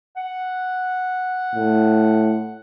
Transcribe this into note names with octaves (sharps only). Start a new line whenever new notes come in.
F#5
A2